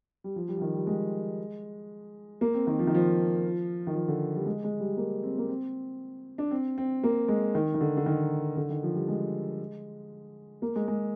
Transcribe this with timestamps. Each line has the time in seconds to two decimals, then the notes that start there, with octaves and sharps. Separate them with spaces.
0.24 G3
0.36 F3
0.48 G3
0.57 F3
0.62 D#3
0.74 G3
0.87 G#3
2.41 A#3
2.54 C4
2.67 D#3
2.79 F3
2.87 D#3
2.95 F3
3.87 D#3
3.95 F3
4.08 D3
4.35 G3
4.46 G#3
4.64 G#3
4.80 G3
4.97 A#3
5.23 C4
5.38 A#3
5.49 C4
6.38 D4
6.51 C4
6.78 C4
7.04 A#3
7.28 G#3
7.55 D#3
7.74 D#3
7.81 D3
7.97 D3
8.06 D#3
8.57 D3
8.70 D#3
8.83 F3
8.95 G3
9.08 G#3
10.62 A#3
10.76 G#3
10.88 G#3